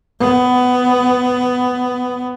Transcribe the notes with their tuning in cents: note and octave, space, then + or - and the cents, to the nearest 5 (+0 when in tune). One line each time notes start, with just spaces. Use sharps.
B3 +15